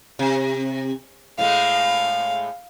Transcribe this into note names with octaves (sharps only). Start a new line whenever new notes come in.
C3
A2 G#3 A3 F5